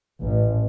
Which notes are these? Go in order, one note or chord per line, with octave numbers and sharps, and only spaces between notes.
A1